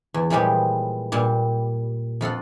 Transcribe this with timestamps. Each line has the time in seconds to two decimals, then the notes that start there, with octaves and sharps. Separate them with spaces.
0.14 E2
0.30 A#2 E3 F3 G3 G#3 G4
1.12 A#2 G3
2.21 F2 F4 A4 F#5